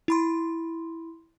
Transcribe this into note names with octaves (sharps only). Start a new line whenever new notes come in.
E4 B5 C6